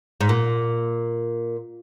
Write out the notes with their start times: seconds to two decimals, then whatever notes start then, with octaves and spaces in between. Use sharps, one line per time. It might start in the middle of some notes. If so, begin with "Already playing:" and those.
0.21 G#2
0.29 A#2